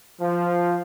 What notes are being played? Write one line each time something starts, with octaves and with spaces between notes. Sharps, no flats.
F3